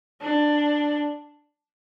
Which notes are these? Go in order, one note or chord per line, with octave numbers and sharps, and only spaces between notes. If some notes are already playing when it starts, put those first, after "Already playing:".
D4